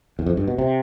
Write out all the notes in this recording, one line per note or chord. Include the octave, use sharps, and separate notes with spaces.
E2
F2
G2
B2
C3